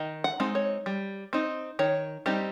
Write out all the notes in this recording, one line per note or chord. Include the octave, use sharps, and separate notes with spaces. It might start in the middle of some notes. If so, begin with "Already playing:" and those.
Already playing: D#3 D#5
F#5
G#3 C4 D#4
C#5
G3
C4 D#4
D#3 C#5
G3 C4 D#4 G4